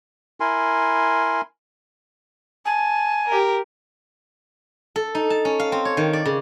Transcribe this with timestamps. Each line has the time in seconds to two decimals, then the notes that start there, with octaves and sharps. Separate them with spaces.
0.40 E4 A#4 G#5 C6
2.65 G#5 A5
3.27 G4 A#4
4.96 A4
5.15 D#4
5.30 A5
5.45 C#4
5.59 F5
5.72 C4
5.85 C#5
5.97 D#3
6.13 D5
6.25 C#3